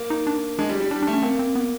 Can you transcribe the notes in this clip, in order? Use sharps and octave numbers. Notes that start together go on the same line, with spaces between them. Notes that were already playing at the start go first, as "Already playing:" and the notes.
Already playing: A#3
D#4
D4
G#3 D4
G3
G3
G3 D4
A3 D4
C#4
A#3 C4
C4
B3